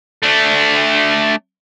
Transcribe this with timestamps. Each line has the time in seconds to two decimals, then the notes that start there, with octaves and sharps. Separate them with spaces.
0.23 A3 D4